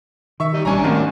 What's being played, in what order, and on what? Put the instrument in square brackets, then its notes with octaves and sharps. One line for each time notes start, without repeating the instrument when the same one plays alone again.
[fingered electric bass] D#3 [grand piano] E5 C#6
[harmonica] G3 D#4
[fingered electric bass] A#1 G3 [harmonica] C#4 D4 [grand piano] G#5 A#5
[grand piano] D#2 G#2 D#3 [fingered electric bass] A3 C4